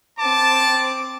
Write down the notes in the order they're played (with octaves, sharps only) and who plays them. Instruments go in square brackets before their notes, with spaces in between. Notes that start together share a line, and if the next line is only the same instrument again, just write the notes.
[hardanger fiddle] C4 D6 [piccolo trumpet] A5